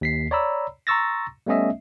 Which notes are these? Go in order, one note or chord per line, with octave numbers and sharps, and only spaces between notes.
D#2 B6 C7
C#5 D5 A#5 B5 E6
A#5 C6 C#6 E6 A6 A#6
G3 A3 B3 C#4 D#5 E5